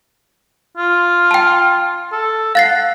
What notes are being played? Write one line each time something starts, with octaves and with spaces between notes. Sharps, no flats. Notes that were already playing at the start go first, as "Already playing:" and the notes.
F4
G5 A5
A4
F5 F#5 A6 C7